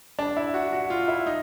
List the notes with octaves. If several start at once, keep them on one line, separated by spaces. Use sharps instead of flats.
D4
E4
F#4
F#4
F4
E4
D#4